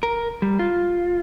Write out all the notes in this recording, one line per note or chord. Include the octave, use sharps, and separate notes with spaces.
A#4
G3
F4